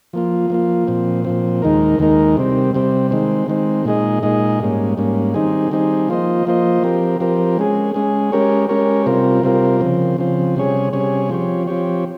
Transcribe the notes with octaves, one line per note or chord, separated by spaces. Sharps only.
F3 A#3 F4
F3 A#3 F4
A#2 F3 C4
A#2 F3 C4
D#2 D#3 G#3 D#4 A#4
D#2 D#3 G#3 D#4 A#4
C3 G3 C4
C3 G3 C4
D#3 G#3 C4
D#3 G#3 C4
A#2 G#3 D#4 G#4 D#5
A#2 G#3 D#4 G#4 D#5
G#2 G3 A#3 C#4
G#2 G3 A#3 C#4
D#3 G3 C4 D#4 G#4
D#3 G3 C4 D#4 G#4
F3 A#3 F4 C5 D#5
F3 A#3 F4 C5 D#5
F3 C4 G4 A#4
F3 C4 G4 A#4
G#3 C#4 G#4
G#3 C#4 G#4
G#3 C#4 G4 A#4 C#5
G#3 C#4 G4 A#4 C#5
C3 G3 C4 F4 A#4
C3 G3 C4 F4 A#4
C#3 F3 C4
C#3 F3 C4
C3 G3 C#4 G#4 C#5
C3 G3 C#4 G#4 C#5
F3 C4 G4 C#5
F3 C4 G4 C#5